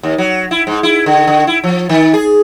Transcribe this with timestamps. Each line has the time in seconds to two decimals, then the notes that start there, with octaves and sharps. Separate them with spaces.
0.03 D#2
0.18 F#3
0.51 E4
0.67 G#2
0.83 E4
1.06 D3
1.27 D3
1.47 E4
1.64 F3
1.89 D#3
2.14 G#4